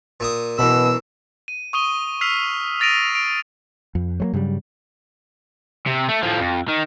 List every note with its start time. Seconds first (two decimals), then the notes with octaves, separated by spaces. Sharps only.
0.20 A#2 E5 D#6
0.59 F#2 B2 E3 B5 E6
1.48 D#7
1.73 C#6 D#6 D#7 G7
2.21 E6 F6 B6 C7 F7
2.80 D#6 A6 A#6 D7 D#7 F7
3.15 D7
3.95 F2
4.20 F#3 G#3 A#3
4.33 G2 C#3 F#3 G3
5.86 C3
6.08 A3
6.23 A2 F3
6.40 F2
6.68 D#3